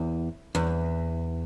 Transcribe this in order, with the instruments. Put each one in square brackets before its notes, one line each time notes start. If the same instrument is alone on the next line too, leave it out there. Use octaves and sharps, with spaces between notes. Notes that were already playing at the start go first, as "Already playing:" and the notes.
Already playing: [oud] E2
E2